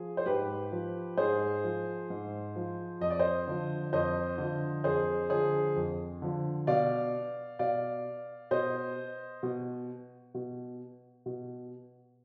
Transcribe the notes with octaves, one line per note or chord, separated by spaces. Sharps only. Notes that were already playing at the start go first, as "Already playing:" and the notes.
Already playing: F3 G#4
C5
G#2 G4 B4
F3
G#2 G#4 C5
F3
G#2
F3
F2 D#5
D5
C5 D#5
D3 F3
F2 C5 D#5
D3 F3
F2 G#4 C5
D3 F3 G#4 C5
F2
D3 F3
B2 D5 F5
B2 D5 F5
B2 C5 D#5
B2
B2
B2